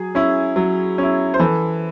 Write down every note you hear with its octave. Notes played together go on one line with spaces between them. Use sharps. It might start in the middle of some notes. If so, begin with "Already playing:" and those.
Already playing: F#3 G#4
C#4 E4
F#3
C#4 E4
C5
E3 A4